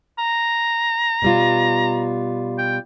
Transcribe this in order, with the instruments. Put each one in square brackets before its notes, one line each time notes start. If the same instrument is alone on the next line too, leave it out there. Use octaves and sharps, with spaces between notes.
[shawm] A#5
[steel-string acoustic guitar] B2 G3 F4
[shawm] G5